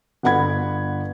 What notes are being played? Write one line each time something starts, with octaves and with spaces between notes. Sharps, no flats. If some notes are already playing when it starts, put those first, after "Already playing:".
G1 B3 F#5 B5 G#6